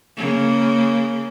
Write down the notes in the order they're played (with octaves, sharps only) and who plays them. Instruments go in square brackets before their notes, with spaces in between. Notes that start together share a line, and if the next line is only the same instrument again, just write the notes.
[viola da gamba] C#3 A#3